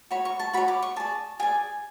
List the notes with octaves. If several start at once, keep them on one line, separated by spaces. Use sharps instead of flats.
F#4 C#5 B5
C#6
A5
F#4 C#5 B5
D6
C#6
G#4 D5 A5
G#4 D5 G#5